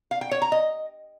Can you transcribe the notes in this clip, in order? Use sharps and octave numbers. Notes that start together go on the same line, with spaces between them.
F5
G5
C#5
A#5
D#5